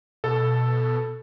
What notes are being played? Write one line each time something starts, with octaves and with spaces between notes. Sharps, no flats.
B2 A4